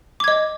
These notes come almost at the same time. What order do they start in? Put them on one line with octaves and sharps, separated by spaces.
D6 G#6 D#5